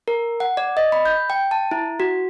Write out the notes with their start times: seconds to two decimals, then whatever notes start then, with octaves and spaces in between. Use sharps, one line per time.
0.08 A#4
0.40 F#5
0.57 D5
0.77 D#5
0.92 B5
1.05 G6
1.30 G5
1.51 A5
1.71 E4
2.00 F#4